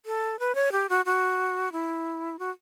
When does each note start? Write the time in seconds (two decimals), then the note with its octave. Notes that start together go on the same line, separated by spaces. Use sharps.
0.06 A4
0.39 B4
0.55 C#5
0.72 G4
0.89 F#4
1.05 F#4
1.72 E4
2.39 F#4